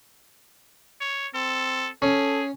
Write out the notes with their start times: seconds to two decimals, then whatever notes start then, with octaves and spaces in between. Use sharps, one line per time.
1.01 C#5
1.34 C4 A4
2.02 C#4 G#4 A4